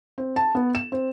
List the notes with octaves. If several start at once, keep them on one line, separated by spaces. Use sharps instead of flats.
C4
A5
B3
E7
C4